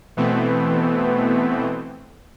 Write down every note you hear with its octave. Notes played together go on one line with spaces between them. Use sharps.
B2 E3 A3 B3 C4